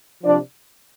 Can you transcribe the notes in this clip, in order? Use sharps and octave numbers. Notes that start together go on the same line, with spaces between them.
C3 F3 D4 D5